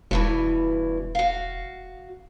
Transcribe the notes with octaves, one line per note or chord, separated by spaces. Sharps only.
E1 G2 B2 E3
F#4 F5